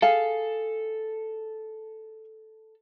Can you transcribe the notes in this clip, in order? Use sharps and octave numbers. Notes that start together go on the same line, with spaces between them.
G#4 A4 F5 G#5